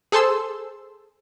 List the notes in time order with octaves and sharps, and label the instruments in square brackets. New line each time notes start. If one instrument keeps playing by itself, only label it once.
[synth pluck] G#4 A4 C5 A5 C6 E6